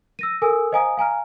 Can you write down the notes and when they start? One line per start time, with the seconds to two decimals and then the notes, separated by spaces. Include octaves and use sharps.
0.19 E6 A#6 D#7
0.42 A4 A#4 G#5 D#6 E6
0.72 C5 D#5 F5 G#5 A#5 D#6
0.97 F5 G#5 A#5 F6